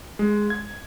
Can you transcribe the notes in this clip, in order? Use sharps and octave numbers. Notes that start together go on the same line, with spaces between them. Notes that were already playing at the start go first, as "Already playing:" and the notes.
G#3
G#6